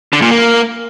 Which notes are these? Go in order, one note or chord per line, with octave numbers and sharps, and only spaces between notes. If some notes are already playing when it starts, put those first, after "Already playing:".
D3
A#2
A#3